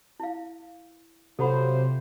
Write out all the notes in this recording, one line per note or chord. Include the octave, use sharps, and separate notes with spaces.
E4 F5
C3 F#3 F4 A4 C5 F#5 B5